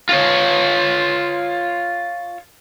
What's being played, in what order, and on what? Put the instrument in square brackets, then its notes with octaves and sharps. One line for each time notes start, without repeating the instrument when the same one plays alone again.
[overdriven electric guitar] F4 C#5